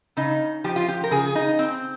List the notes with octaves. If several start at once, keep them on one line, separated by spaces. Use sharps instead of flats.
C#3 D#4
F3 G4
F4
G4
A#4
C#3 G#4
D#4
C4